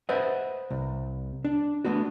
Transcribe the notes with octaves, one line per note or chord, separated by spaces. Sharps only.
B4 C5 D#5 E5 F#5
C2
D4
A3 B3 D4 F#4